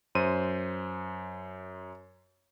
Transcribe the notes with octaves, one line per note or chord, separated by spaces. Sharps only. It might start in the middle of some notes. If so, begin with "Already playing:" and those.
F#2 C5 D#7